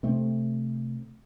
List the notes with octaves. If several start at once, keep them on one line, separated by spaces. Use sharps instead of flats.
C3 A3 C4